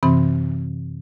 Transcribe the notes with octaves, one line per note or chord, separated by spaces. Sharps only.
F#2 C3 E3 C4 B5